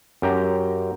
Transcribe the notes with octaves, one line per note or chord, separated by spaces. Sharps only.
F#2 G4 G5 A#5